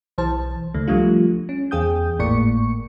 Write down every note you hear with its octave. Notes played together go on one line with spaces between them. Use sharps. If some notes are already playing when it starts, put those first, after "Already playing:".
B1 E3 C5 A5
C#2 D#3 A3
F3 G3 A3 D4 F4
C#4
E2 G#4 G5 D#6 G6
G#1 A2 A#3 D5 C#6 C#7